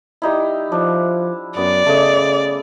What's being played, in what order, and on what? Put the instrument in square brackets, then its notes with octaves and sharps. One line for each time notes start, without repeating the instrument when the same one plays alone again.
[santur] G3 D#4 E4
[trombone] F3 [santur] D4
[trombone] F#2 [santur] B3 [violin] D5
[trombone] C#3 [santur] A3 D#5